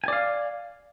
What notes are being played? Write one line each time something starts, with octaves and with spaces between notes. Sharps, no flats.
D5 F5 G#5